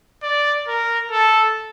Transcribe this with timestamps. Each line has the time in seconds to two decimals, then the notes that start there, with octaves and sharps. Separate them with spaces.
0.23 D5
0.68 A#4
1.12 A4